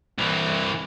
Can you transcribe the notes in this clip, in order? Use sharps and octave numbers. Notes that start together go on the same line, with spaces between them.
C2 E3